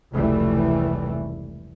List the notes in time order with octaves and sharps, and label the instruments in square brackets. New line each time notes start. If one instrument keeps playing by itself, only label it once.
[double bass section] F1 C#2 E3 G3 A3